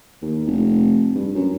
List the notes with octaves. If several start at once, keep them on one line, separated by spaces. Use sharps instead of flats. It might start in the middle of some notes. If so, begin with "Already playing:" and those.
D#2
F1
G2
F#2